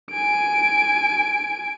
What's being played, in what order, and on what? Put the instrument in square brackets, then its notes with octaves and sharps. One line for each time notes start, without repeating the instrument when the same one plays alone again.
[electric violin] G#5 D7